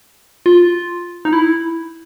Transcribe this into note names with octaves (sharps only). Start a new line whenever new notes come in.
F4
D#4
E4